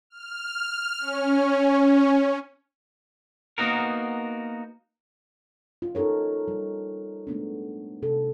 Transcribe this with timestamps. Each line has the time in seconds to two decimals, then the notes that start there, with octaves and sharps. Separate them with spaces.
0.10 F6
0.99 C#4
3.58 A#3 B3 D#4 F#4 A#4
5.82 F4
5.95 D#4 F4 A4 A#4 C#5
6.48 G3
7.27 G#3 A3 B3 D4
8.02 C3 A4